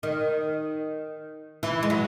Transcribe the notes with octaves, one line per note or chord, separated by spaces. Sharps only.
D#3
E3
G#3
F#3